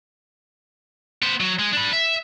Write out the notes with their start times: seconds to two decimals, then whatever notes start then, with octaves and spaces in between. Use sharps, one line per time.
1.23 B3 C5
1.40 F#3
1.59 G#3
1.73 D4 B5
1.93 E5